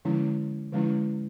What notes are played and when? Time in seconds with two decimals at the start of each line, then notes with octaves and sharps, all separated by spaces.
0.05 D3 F3 G#3 C#4 E4
0.72 D3 F3 G#3 C#4 E4